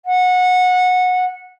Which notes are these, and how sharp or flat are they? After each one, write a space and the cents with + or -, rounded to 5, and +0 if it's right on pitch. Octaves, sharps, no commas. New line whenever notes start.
F#5 -20